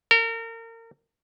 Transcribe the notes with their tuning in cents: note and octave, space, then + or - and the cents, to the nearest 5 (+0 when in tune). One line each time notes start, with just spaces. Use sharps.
A#4 -35